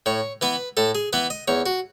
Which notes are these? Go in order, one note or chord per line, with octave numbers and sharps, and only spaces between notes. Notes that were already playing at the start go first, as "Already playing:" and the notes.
A2 C#5
E3 B3 B4
A2 A4
G#4
E3 B3 B4
D#5
E2 C#5
F#4